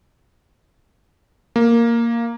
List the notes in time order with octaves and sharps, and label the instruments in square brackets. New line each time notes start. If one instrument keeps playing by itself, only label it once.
[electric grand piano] A#3